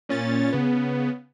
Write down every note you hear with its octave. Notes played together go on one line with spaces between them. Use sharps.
A#2 C#4 A6
C#3 B3